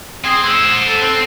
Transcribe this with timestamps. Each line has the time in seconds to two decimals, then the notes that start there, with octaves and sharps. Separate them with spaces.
0.24 C4 G#4
0.44 C5 F#5 E6
0.87 A4
1.03 C4